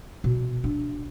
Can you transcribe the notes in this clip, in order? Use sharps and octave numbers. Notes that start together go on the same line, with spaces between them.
B2
D4